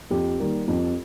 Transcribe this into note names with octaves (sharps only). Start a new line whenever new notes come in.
F2 G4
D#3 G3 A#3
F2